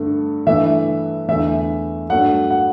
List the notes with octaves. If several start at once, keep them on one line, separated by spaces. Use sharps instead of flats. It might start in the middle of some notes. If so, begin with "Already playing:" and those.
Already playing: G2 D3 A3
G2 E3 A3 E5
E2 D3 A3 E5
G2 F#3 A3 F#5
F#5